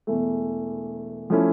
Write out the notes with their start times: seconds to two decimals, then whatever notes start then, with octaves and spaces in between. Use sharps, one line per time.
0.07 E1 E2 E3 A3
1.30 F3 A3 C#4 E4